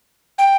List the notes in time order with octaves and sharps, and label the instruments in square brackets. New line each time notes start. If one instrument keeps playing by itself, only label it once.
[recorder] G5